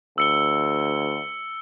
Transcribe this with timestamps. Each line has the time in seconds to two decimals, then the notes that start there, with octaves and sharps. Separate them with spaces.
0.18 D2 E6 C#7 G7